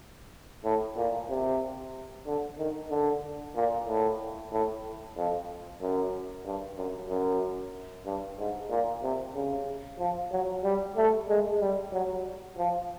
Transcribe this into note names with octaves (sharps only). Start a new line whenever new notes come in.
A2
A#2
C3
D3
D#3
D3
A#2
A2
A2
F2
F#2
G2
F#2
F#2
G2
G#2
A#2
C3
C#3
F3
F#3
G3
A3
G#3
G3
F#3
F3